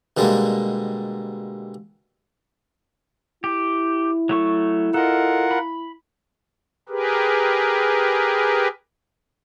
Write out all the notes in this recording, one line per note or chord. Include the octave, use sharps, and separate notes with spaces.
B2 D3 G3 G#3 A#3
E4 G4
F#3 A3 C#6
F4 A4 A#4 D#5 F#5
B5
G4 G#4 A#4 B4